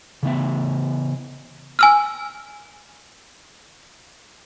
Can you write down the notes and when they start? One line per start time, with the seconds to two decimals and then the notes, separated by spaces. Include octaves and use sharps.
0.23 C#3 E3 B3 E5
1.79 G#5 E6 F6